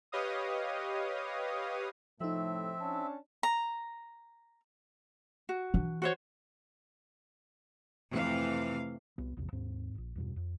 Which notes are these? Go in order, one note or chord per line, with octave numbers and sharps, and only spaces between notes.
G4 B4 C#5 D#5 F5 D#6
A2 C3 F3 A3 C4 D#4 E5
C#4 D4 A5
A#5
F#4
E3 D4
F#4 C5 C#5
F2 C3 E3 A3 F5
C2 B3
A#1 E2 C3
D#2 G#2 C4
E1 A#1
E2 G2 B2
F2